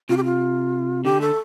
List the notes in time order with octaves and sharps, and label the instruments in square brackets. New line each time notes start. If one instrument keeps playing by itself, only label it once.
[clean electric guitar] C3 [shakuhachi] F4
[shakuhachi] G4
F4
[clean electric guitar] D3 [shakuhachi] G4
[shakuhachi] A4